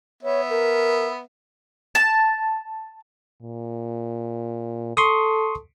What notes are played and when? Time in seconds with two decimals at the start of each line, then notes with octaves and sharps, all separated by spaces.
0.23 B3 C#5 E5
0.50 A#4
1.95 A5
3.43 A#2
4.97 A4 C6 C#6 D#6